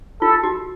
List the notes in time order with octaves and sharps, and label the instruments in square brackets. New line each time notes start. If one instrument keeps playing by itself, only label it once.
[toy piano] F4 [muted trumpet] A4
[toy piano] F#4